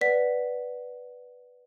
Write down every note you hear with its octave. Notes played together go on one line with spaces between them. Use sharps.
B4 D5 F#5 B6